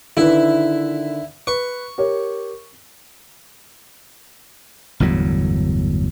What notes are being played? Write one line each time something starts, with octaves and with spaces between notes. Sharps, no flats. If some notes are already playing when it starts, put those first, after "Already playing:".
D3 D#3 E4 B4
B4 C#6
G4 A#4 C#5
G1 E2 A2 F#3